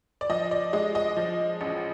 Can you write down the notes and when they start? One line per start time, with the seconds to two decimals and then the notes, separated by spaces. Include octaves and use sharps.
0.21 D5
0.29 F3 D#5
0.51 D5
0.73 G#3 D#5
0.95 D#5
1.17 F3
1.61 A1